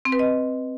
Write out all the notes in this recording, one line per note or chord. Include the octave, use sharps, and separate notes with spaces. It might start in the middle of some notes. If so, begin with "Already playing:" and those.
C4
B4
D#5